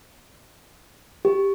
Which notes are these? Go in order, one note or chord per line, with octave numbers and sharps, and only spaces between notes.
G4